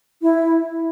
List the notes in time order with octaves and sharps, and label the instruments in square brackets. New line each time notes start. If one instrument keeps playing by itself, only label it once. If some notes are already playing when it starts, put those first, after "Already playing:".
[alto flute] E4